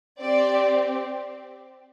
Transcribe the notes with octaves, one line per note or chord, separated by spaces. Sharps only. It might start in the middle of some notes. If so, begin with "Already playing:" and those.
C4 G4 D5